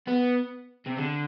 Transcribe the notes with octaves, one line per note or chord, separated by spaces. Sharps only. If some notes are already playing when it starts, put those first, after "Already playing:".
B3
C3
D3